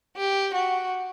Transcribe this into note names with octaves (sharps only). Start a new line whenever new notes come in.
G4
F#4